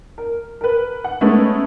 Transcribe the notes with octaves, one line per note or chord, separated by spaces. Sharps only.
A#4
A#4 B4
F#5
G#3 A3 B3 C#4 D#4